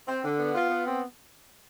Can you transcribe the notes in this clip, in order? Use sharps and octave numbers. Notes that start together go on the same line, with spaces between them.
C4
D3
B3
F4
B3
C4